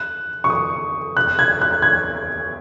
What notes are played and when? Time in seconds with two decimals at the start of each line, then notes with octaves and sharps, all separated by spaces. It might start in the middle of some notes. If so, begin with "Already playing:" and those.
Already playing: F#6
0.44 C#6
0.50 D#6
1.17 F#6
1.39 G#6
1.61 F#6
1.82 G#6